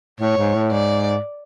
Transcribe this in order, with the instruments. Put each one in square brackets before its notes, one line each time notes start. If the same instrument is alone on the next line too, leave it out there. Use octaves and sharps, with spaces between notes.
[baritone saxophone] A2 [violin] C#5
[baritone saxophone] G#2
A2
[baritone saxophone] G#2 [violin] D5